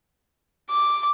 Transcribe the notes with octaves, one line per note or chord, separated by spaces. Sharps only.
D6